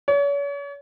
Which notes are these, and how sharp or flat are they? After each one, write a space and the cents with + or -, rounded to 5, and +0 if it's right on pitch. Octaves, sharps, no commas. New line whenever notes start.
C#5 +40